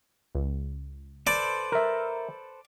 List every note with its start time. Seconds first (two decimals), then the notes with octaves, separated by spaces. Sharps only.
0.35 C#2
1.27 A4 B4 C5 D5
1.72 A#4 E5